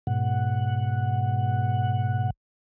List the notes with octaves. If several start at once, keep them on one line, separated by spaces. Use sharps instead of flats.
G#2 B2 F#5